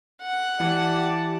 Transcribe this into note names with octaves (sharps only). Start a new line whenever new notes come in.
F#5
E3 G4 D5 A5